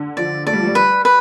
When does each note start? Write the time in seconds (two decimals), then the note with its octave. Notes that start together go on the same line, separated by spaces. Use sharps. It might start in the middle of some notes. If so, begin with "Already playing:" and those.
Already playing: D3
0.17 F3 D5
0.47 A3 D5
0.53 G3
0.60 F3
0.67 G3
0.75 B4
1.05 B4